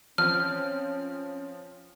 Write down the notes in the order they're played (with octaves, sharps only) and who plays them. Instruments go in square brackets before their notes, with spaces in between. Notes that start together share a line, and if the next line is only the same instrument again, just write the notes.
[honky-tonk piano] F3 C4 [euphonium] C#4 [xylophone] F6